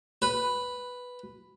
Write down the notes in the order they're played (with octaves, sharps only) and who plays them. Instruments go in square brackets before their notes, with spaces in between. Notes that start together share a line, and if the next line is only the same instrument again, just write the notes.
[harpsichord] B4